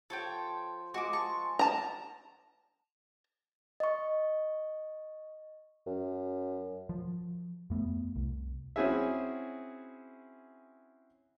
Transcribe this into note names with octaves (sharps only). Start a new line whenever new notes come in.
F3 A4 C#5 G5
G#3 F4 F#4 G#4 D6
A5 C#6
A5 A#5
D#5 C#6
F#2
F3
F2 A3 B3
C2
C4 C#4 E4 F#4 G#4 E5